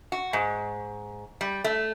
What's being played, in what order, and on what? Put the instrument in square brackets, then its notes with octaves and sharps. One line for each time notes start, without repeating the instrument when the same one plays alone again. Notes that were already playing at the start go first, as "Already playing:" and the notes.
[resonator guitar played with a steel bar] F#4
G#2
G3
A3